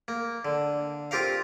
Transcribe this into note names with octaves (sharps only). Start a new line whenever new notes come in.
A#3
D3
C4 F4 G4 A#4 F5